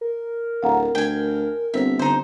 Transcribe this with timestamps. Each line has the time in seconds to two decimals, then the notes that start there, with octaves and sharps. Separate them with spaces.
0.01 A#4
0.63 D1 F5 F#5 A#5
0.95 D2 G5 G#5
1.74 G1 C4 C5 E5
1.99 D3 D#4 C5